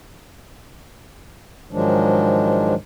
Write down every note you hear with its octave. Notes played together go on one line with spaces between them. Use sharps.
G#2 D#3 F3 F#3 G#3 D4